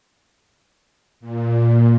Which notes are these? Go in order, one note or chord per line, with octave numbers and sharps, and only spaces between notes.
A#2